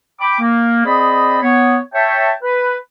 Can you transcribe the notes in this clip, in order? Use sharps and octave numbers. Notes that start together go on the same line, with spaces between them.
G5 B5 D6
A#3
C4 G#4 C5 D5 D#5 B5
B3 C#5
C#5 E5 G5 A5
B4